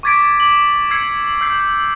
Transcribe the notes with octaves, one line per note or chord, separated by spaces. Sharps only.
C#6 D6 G#6 A6 B6 D7
D6 F#7
E6 G#6 C7 C#7
E6 G6 C7